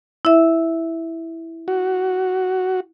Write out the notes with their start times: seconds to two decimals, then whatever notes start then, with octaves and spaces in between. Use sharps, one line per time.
0.25 E4 E5
1.68 F#4